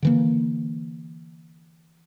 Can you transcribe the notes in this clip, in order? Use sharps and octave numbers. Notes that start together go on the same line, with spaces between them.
D3 E3 A#3